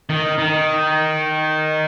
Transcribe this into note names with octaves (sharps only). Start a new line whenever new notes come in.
D#3
D#3